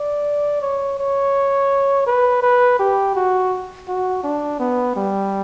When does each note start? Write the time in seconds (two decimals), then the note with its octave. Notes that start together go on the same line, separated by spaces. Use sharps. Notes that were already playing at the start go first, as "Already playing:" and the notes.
Already playing: D5
0.62 C#5
0.99 C#5
2.07 B4
2.43 B4
2.79 G4
3.16 F#4
3.88 F#4
4.24 D4
4.60 B3
4.96 G3